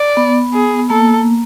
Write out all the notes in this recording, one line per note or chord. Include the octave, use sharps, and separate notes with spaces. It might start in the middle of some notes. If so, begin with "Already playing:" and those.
Already playing: D5
B3
G#4
A#3 A4